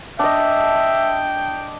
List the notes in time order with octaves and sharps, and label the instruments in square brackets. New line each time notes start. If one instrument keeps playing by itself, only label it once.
[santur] D4 D#5 [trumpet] E5 [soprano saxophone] G5